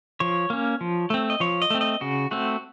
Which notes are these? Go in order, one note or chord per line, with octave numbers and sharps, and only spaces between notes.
F3 C#5
A#3 C#4
F3
A3 C4
D#5
F3 C#5
D#5
A3 C4
D#5
C#3 F#4
A3 C4 F#4